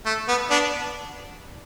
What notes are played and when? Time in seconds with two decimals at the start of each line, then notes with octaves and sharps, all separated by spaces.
0.06 A3
0.28 B3
0.51 B3 D4